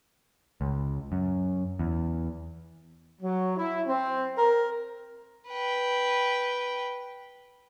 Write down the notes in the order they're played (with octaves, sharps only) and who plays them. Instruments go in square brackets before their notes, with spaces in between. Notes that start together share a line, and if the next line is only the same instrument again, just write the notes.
[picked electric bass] C#2
F#2
E2
[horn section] F#3
E4
C4
A#4
[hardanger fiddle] B4 G5